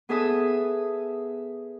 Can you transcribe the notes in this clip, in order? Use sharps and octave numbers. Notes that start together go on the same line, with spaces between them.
B3 G#4 A4 E5 D#6